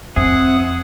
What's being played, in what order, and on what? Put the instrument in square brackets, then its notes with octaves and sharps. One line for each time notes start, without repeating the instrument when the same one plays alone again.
[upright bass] F2 [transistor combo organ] C4 E5 [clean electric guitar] G#4 [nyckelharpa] F#5